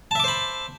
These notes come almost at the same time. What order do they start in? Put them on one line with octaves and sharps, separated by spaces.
A5 E5 D6 C5 B5